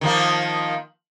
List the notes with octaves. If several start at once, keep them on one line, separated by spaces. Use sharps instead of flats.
D#3 F3 A#3